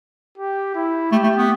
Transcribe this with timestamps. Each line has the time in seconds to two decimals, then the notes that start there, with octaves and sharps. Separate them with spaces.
0.38 G4
0.75 E4
1.12 A3 G4
1.24 A3
1.36 B3